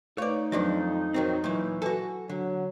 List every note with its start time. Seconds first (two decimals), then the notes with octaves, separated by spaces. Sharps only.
0.18 A3 D#4 B4 C#5 D5
0.52 F2 D#3 F3 F#3 D4 B4 D5
1.14 F2 D#3 F#3 C4
1.44 D#2 A#2 E3 F#3 C#6
1.82 F#4 A4 B4 G#5
2.29 D3 F#3